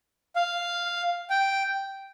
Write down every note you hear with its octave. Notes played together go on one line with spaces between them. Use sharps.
F5
G5